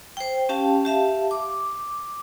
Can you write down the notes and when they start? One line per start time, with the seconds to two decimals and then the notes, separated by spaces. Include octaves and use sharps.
0.17 C5 G5
0.49 C#4 G4 F5 G5 A5
0.85 G4 E5 F5 A5
1.31 D6